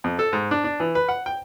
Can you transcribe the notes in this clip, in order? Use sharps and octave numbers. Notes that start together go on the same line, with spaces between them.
F2
A4
G#2
D4
D4
E3
B4
F#5
G5